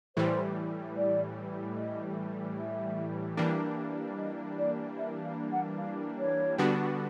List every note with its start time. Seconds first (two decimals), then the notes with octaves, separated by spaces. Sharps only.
0.16 A2 E3 G3 C5
0.96 D5
1.76 D#5
2.57 E5
3.37 E3 G3 A#3 D4
4.17 D#5
4.58 D5
4.98 E5
5.25 F5
5.52 F#5
5.78 F5
6.18 C#5
6.58 D3 G3 B3 D4 F#4